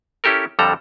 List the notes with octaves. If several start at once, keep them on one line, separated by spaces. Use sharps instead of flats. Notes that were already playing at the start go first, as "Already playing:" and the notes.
C#4 E4 G4 A4 A#4
F2 D3 G3 A4 A#5